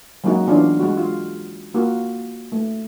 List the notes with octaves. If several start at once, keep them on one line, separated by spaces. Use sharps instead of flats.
F#3 G#3 A#3 C#4 D#4 F#4
E3 B3 C#4 D4 F4
G#3 F#4
F4
A#3 F4 F#4
A3